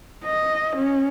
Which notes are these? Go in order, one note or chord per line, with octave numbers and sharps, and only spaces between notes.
D#5
C#4